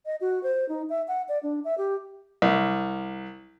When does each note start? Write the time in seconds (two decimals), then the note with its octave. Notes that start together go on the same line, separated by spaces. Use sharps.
0.06 D#5
0.21 F#4
0.43 C5
0.69 D#4
0.89 E5
1.08 F#5
1.29 D5
1.43 D4
1.65 E5
1.78 G4
2.42 C2